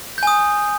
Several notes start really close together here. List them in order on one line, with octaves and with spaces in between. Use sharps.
G6 G#5 D#6